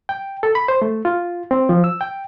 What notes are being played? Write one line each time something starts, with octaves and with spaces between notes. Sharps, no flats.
G5
A4
B5
C5
A3
F4
C4
F3
E6
G5